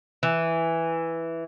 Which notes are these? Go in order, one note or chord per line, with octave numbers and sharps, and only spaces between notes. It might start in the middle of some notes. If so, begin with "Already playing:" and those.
E3